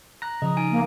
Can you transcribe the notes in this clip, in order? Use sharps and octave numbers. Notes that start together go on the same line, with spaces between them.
A#5 F#6 A#6
C#3 F3 D#5 A#5 D#6
D#4 G#5 D7
A#3